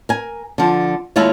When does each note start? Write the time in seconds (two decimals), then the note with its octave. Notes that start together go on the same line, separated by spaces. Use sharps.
0.09 A#4 G#5
0.58 D3 F3
1.16 D#2 G#3 E4 F4 A4 C#5